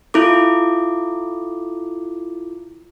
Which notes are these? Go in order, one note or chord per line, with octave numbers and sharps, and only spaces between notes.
E4 F4 A4 D6